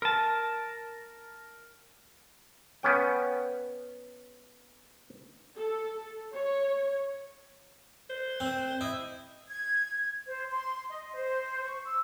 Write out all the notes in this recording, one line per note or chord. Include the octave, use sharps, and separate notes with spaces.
A#4 A5
B3 C#4 G5
A4
C#5
C5
C4
E4 D#5
G#6
C5
C6
D#5
C5
C#6
E6